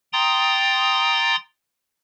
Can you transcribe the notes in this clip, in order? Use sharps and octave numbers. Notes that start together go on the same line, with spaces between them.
G5 A#5 C6 D#6 A6